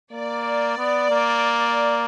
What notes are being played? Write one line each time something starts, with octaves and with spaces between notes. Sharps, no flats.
A#3 D5
B3
A#3